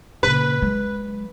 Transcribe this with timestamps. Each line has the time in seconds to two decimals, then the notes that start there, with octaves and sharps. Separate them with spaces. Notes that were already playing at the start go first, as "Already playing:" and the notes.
0.23 A#2 C#3 B4
0.62 F#3 G#3